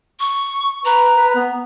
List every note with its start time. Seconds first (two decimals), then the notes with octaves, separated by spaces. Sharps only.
0.20 C#6
0.85 B4 A#5
1.17 B4
1.35 B3